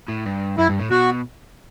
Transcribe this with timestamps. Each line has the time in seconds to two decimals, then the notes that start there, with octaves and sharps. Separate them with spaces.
0.09 A2
0.26 G2
0.58 F#2 E4
0.69 G2
0.80 A2
0.91 B2 F#4